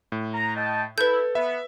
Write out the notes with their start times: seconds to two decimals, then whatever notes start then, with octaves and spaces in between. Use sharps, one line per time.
0.12 A2
0.34 A#5
0.56 D#5 G5 A5
0.98 E4 A4 B4 G6
1.35 B3 E5